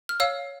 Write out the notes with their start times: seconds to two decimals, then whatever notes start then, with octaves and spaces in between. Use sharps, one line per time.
0.09 F6
0.20 C#5 F5 E6